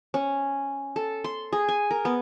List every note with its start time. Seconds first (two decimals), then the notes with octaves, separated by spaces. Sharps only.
0.14 C#4
0.96 A4
1.24 C6
1.53 G#4
1.68 G#5
1.91 A#4
2.05 B3